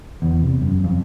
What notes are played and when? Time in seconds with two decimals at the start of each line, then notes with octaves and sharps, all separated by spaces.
0.22 E2
0.43 C3
0.61 F#2
0.84 F2